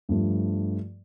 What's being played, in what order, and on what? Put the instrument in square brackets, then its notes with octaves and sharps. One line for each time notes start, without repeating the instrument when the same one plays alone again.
[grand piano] G2 F3 A3